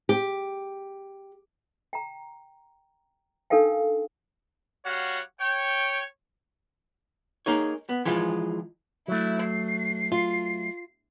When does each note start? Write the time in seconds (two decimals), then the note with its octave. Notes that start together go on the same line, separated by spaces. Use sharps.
0.09 G4
1.93 G5 A#5
3.50 D4 D#4 A4 A#4 F5 G5
4.85 G3 F#4 C#5 F5 F#5
5.41 C#5 G5
7.46 A#3 D#4 G#4 C#5
7.89 B3
8.05 E3 F3 G#3 F4
9.08 F#3 A3 E4
9.43 C7
10.12 F4